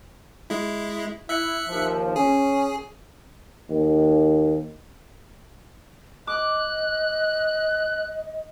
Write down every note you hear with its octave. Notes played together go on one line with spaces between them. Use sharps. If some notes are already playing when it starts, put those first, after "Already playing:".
G#3 E4
E4 E5 F#6 C#7
D#2 F3
C#4 G#4
D#2
D#5 D6 F#6